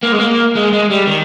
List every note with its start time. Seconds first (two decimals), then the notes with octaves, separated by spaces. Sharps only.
0.03 A#3
0.12 G#3
0.20 A#3
0.55 G#3
0.72 G#3
0.90 G3
1.07 D#3